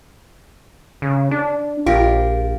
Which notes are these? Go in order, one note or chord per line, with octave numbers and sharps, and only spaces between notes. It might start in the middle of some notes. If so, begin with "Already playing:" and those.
C#3
D4
A#1 F4 G4 A#4